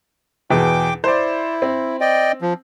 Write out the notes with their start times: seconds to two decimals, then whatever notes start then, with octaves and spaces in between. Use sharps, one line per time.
0.50 E2 B2 G#4 G5 D6
1.04 E4 C5 D5
1.62 C4
2.01 D5 D#5 G5
2.41 F3